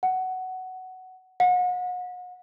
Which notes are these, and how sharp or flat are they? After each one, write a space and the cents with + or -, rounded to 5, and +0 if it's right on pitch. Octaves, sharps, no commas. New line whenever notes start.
F#5 +10
F#5 -35